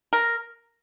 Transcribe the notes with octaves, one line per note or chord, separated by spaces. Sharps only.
A#4